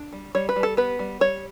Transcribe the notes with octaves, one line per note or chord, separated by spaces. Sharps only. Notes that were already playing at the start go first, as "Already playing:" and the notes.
Already playing: D4
G3
G3 C#5
B4
G3
A4
B3 B4
G3
G3 C#5